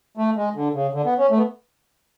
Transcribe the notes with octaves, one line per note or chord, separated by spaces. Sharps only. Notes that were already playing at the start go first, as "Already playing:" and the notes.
A3
G#3
D3
C#3
D3
B3
C#4
A3
B3